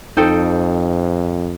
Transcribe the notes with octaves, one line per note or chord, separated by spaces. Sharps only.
F2 D#4 A4 C5 G5